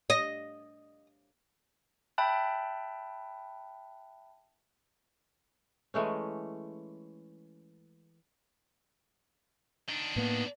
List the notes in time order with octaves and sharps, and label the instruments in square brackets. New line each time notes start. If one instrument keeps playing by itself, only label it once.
[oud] D#5
[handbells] E5 G5 A5 B5 F#6
[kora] E3 G#3 A3 C#4
[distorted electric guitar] D#3 D4
[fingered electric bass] A2 A#3 [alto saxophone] B3